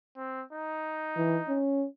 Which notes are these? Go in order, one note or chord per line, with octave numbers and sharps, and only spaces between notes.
C4
D#4
E3
C#4